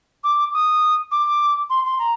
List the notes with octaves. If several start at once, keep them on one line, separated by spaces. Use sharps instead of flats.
D6
D#6
D6
C6
C6
A#5